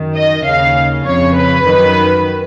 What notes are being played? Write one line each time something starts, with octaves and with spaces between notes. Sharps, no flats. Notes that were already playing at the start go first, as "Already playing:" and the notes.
Already playing: F#2 D#3
D#5
D#2 C#3 F5
F2 C#3 C#5
B4
F#2 D#3